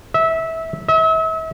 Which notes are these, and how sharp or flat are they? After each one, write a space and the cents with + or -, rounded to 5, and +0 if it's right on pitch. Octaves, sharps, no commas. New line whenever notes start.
E5 -20
E5 -40